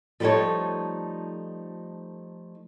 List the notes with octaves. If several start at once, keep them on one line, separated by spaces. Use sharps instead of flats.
F3 G3 A3 D#4 A4 C#5